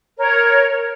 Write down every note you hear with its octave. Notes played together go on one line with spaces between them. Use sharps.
A#4 C#5